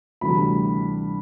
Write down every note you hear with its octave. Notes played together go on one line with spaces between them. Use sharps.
D2 C3 E3 G3 B5